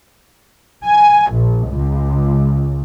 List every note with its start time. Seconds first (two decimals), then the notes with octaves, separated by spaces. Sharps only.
0.85 G#5
1.31 A#1
1.69 C#2